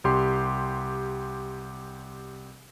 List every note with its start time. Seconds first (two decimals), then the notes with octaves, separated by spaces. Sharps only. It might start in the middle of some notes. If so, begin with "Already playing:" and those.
0.04 C2 G4 C6